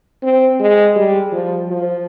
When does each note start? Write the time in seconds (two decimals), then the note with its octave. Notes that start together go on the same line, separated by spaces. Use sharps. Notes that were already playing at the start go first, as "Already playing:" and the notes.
0.23 C4
0.60 G#3
0.96 G3
1.32 F3
1.69 F3